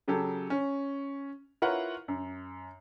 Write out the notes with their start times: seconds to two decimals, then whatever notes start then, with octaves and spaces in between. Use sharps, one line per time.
0.08 C#3 F#3 G4 A4
0.50 C#4
1.62 E4 F4 A#4 B4 C#5 F#5
2.08 F#2